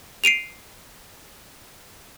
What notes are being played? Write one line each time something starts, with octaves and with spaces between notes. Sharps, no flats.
C7 D7 D#7 F7